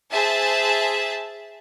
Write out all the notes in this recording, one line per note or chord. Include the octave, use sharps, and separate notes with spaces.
G#4 C5 E5 A5